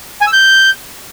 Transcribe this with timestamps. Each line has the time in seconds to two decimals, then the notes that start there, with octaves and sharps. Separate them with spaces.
0.21 G#5
0.27 E6
0.33 G6